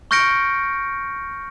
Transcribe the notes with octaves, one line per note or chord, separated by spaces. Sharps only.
C#6 F6 G6 A#6 C#7 D7